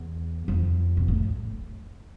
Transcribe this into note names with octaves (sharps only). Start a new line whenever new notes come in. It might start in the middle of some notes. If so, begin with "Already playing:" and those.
Already playing: E2
F2
B2
A2